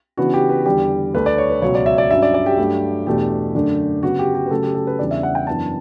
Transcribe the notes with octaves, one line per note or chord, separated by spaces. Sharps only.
C#3 E3 B3 D4 F#4
G4
B4
E2 D3 G3 G4
D2 D3 A3 D4 B4
D5
C#5
B4
C#2 B2 F#3 C#5
D5
E5
D5
G2 F#3 C#4 E5
D5
D5
G4
G2 F#3 A3
E2 B2 A3 D4 G4
F#2 D3 A3 D4
C#3 F#3 B3 F#4
G4
G4
B4
C#3 F#3 A3 A4
G4
A4
B4
E2 C#3 G3 D4 D5
E5
F#5
G5
F#2 E3 B3 D4 A5